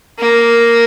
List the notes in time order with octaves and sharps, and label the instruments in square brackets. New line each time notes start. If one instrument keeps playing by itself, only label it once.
[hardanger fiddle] A#3